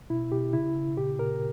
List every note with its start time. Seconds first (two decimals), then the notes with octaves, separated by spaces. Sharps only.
0.10 B2 E4
0.31 B2 G4
0.53 C#3 E4
0.75 C#3
0.96 A#2 G4
1.19 A#2 A#4